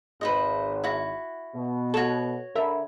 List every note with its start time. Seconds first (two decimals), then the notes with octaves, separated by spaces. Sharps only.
0.21 G#1 B4 C5 D#5
0.84 E4 F#4
1.55 B2
1.94 F#4 A4 C#5
2.55 D3 A#4 E5 B5